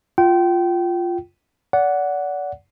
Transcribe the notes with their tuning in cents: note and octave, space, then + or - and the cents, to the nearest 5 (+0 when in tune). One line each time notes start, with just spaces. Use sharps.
F4 +0 G5 -25
D5 -30 F#5 +0